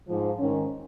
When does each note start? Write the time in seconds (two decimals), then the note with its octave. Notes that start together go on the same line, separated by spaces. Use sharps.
0.09 G#2 F3
0.39 G#2 D#3 C#4